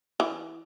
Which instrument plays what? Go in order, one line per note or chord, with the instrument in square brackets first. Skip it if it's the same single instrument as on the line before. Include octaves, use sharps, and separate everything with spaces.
[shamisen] E3